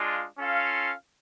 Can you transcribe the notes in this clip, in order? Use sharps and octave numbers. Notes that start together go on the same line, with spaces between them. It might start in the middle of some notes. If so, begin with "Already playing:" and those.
Already playing: G#3 D4 F4
C#4 F4 A4 F5